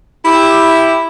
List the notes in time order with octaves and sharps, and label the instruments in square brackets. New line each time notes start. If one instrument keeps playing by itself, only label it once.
[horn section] E4 G4